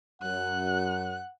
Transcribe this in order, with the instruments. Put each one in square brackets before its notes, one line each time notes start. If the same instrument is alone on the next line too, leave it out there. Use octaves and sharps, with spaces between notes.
[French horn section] F#2 [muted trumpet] F#5 [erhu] F#6